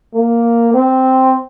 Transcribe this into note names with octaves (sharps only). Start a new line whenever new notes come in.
A#3
C4